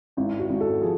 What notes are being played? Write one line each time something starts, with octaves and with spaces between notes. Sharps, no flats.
G#1 E4
F#4
G#1
A4
F3 G#4